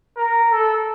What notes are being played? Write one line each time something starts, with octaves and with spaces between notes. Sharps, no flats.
A#4
A4